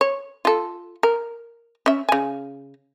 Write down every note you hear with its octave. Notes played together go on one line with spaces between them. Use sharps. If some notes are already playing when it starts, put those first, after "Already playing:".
C#5
F4 A4
A#4
C#4 E5
C#3 G#5